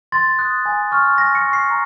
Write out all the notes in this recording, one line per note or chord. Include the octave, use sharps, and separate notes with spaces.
C6 A6
D#6 F#6
G#5
C#6 F6
G#5 A#6
C#7
C#6 F6
C7
A#5